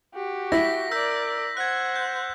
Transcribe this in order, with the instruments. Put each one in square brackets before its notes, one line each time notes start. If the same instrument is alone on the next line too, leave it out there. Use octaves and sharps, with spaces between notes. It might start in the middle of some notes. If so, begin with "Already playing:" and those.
[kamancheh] F#4 G4
[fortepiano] E4 [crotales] A#6 B6
[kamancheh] A#4 D5 [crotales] E6 G6 B6
[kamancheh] C5 F#5 [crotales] F#6 G#6
[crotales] G6